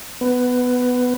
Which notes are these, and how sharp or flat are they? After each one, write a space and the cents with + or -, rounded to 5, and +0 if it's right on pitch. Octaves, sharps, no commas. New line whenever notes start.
B3 +10